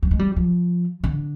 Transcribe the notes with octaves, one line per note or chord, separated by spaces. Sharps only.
G3
G#3
G3
F3
D3